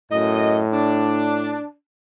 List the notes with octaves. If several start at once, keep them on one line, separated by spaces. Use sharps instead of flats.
F#2 A2 D#5
D4